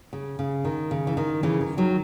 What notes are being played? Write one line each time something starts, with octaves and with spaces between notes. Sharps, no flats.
C#3
C#3
D#3
C#3
E3
D#3
C#3 E3
D#3
D#3 F#3